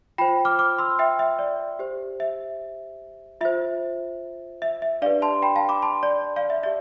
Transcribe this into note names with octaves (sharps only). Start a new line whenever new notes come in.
F4 C5 G5 B5
D6 F6
D6 F6
C6 E6
E5 G5
E5
D5
G4 C5
E5
F4 C5 E5
E5
E5
D4 G4 B4 D5 F5
A5 C6
G5 B5
F5 A5
B5 D6
A5 C6
D5
D5 F5
E5
G4 D5 E5